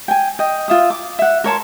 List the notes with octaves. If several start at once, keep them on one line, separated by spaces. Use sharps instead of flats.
G5 G#5
D#5 G5
F4 E5 D#6
D6
E5 F#5
A#4 C#5 A5 C6